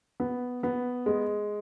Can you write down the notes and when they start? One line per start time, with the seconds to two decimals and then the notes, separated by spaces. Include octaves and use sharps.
0.20 B3
0.63 B3
1.06 G#3